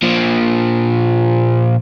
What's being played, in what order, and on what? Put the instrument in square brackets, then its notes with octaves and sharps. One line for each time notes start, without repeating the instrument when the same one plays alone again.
[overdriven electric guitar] A#2 F3